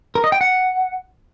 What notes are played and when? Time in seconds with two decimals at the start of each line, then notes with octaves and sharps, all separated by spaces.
0.15 A#4
0.24 D#5
0.32 G5
0.41 F#5